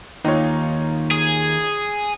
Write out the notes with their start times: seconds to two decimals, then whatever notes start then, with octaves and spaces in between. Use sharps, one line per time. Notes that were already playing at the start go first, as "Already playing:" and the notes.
0.24 D#2 D#4 F4 C#5
1.11 G#4